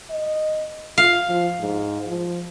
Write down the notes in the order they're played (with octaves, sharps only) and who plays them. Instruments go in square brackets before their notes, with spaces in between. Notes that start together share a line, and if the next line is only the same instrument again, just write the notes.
[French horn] D#5
[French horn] F4 [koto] F5
[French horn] F3
G#2
F3